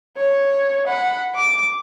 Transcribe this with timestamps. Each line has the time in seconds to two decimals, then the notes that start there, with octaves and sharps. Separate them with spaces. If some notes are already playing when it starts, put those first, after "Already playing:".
0.17 C#5
0.87 F#5 B5
1.35 D6